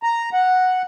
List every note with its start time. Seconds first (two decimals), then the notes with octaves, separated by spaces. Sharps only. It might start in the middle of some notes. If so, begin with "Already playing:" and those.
0.03 A#5
0.33 F#5